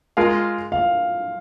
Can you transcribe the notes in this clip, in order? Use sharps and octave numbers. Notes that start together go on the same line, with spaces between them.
G#3 F4 A#4 F5
F5